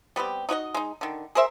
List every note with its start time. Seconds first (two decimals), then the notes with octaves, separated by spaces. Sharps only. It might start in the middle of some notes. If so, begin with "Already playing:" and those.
0.16 G3 B3 C4 G4
0.49 D#4 F#4 C#5 D#5
0.74 G#3 D#4
1.01 D3 D#3
1.35 G#4 A#4 C5 E5